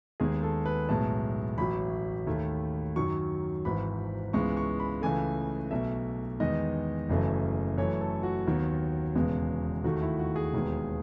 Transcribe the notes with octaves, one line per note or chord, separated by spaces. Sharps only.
D#2 D#3 G#3 B3 G#4
A4
B4
B1 A2 G#3 B3 A5
A1 A2 F#3 B5
D#2 D#3 A3
F#2 D#3 F#3 C#6
G#1 G#2 E3 B5
C#2 C#3 E3 G#3 B3 C#6
C#6
B5
C#2 C#3 E3 A3 G#5
B1 B2 A3 E5
E2 D#3 G#3 B3 D#5
F#1 F#2 C#3 E3 A3
F#2 E3 A3 C#5
A4
F#4
D#2 D#3 F#3 B3
E1 E2 C#3 G#3 B3
D#2 D#3 A3 F#4
E4
F#4
G#4
E1 D#2 D#3 G#3 B3